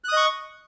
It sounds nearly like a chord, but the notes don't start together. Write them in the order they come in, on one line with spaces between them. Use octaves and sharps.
F#6 D#6 D#5 C#6